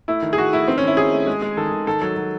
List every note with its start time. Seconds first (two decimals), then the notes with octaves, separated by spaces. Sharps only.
0.08 A3 E4
0.22 D#3
0.33 G#4
0.38 D#3 F#4
0.53 A3 E4
0.68 D#3 C4
0.78 C#4
0.83 D#3 E4
0.97 D#3 G#4
1.13 A3
1.27 G#3
1.42 G#3
1.57 D#3 A4
1.72 D#3
1.87 D#3 A4
2.02 F#3 A4
2.16 F#3